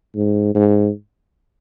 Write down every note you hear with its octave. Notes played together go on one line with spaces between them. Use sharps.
G#2
G#2